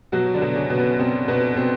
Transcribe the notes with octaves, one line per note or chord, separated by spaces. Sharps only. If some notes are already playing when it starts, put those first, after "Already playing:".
B2 F#3 F#4
D3 D4
B2
C#3 C#4
B2
B3
B2 C4
B2 B3
B2 C4